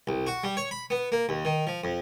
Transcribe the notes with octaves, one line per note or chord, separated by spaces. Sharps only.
C2
F#4
G3
C#5
B5
B3
A#3
D#2
D#3
F3
F2